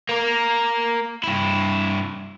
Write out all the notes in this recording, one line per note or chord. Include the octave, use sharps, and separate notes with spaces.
A#3 A#4
G2 E4